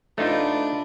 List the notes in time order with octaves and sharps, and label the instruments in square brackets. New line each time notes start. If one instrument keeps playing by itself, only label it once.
[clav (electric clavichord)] A3 D#4 F4 [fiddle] D4 B4